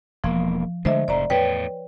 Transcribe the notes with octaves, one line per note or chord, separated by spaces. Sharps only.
E1 F3 A#3
D3 G#3 A3 C5 D#5 E5
F1 G#2 D5 A#5
E2 A2 B4 C#5 G5